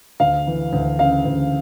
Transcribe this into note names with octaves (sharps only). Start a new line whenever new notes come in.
D2 F5
E3
D2
C#3 F5
D2